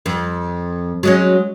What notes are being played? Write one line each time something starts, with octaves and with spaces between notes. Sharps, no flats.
F2
F#3 G#3 C#4